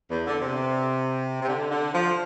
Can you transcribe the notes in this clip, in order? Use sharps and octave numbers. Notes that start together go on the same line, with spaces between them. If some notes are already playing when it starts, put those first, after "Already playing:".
E2
D3
C3
C3
D3
D3
F3